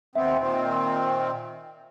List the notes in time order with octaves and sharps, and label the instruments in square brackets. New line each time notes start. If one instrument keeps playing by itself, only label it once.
[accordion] D#2 B3 C4 [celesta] E5
[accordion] A#2 D#3 C4